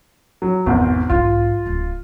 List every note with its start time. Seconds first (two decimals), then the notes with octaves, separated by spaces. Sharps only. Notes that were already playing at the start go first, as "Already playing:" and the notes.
0.42 F#3
0.66 G#1 E2 B2
1.10 B1 G#2 F4
1.66 D1 C#4